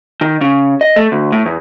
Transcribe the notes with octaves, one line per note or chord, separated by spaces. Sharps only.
D#3
C#3
D#5
A3
D2
A2
E2